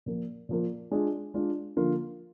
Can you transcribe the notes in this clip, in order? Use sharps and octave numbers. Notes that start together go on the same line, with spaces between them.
A#2 F3 A#3
A#2 F3 A#3
G#3 D4 F4
G#3 D4 F4
D3 F3 A#3 F4